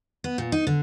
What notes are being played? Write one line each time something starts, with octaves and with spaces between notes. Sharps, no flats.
B3
A#2
D#4
D3